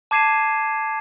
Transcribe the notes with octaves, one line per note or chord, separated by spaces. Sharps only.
A5 D6 G#6 C7 D#7 E7